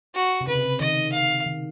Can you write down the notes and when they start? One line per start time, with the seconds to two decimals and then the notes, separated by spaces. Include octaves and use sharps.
0.15 F#4
0.41 C3
0.47 C#3 B4
0.55 C3
0.64 C#3
0.80 D#3 D#5
1.12 F5
1.46 D#3